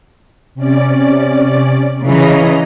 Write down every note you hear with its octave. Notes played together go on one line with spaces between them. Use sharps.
C3 C#4 D5
C#3 E3 C#5 D#5 A#5